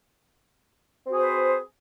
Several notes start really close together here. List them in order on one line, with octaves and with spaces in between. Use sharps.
C4 F#4 G#4 C5 B4